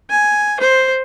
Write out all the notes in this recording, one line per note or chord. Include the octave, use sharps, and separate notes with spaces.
G#5
C5